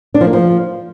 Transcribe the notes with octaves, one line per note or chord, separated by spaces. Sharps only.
D4
F3
A#3
F3